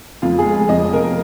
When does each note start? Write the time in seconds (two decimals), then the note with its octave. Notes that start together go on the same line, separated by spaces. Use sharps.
0.22 F2 F4
0.38 G#4
0.46 G#3
0.69 F2 D#5
0.93 C3 A#4